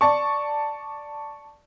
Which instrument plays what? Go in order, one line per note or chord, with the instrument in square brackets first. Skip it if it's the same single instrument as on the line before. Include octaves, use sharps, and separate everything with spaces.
[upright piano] D5 A5 C#6